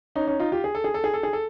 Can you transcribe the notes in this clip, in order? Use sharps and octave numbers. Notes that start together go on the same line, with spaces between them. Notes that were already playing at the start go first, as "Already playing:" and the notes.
C#4 D#4
C#4 D#4
D#4 F4
F4 G4
G#4
A4
G#4
A4
G#4
A4
G#4
A4